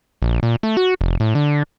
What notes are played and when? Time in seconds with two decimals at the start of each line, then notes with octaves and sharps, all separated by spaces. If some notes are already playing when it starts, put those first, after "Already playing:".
0.22 A#1
0.43 A#2
0.63 A3
0.77 F#4
1.01 F1
1.20 A2
1.35 D3